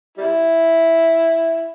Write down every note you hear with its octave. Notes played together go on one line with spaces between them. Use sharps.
G3 E4